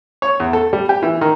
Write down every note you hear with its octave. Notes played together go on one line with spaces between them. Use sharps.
C#5
E2
A4
G3
G4
E3
D#3